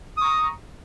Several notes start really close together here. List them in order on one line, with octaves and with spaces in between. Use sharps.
D#6 C#6 A#5